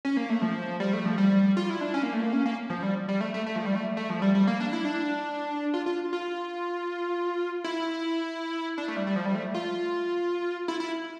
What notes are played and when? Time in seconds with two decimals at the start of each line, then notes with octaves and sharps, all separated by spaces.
0.05 C#4
0.17 A#3
0.30 A3
0.42 F3
0.80 G3
0.93 A3
1.05 F3
1.18 G3
1.57 F4
1.70 E4
1.81 D4
1.94 C#4
2.03 A#3
2.13 A3
2.22 A#3
2.33 C#4
2.46 A#3
2.70 F3
2.83 G3
3.08 G3
3.21 A3
3.34 A3
3.46 A3
3.56 F3
3.65 G3
3.75 A3
3.97 A3
4.10 F3
4.22 G3
4.35 G3
4.47 A#3
4.60 D4
4.73 E4
4.85 D4
5.74 F4
5.86 F4
6.13 F4
7.64 E4
8.78 D4
8.88 A3
8.96 G3
9.07 G3
9.16 F3
9.26 G3
9.35 A3
9.54 F4
10.68 E4
10.80 E4